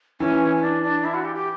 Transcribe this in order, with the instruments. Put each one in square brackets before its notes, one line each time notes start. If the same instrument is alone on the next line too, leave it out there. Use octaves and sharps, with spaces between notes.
[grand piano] E3 [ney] C#4
[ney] C#4
D4
D4
E4
F#4
G4
G4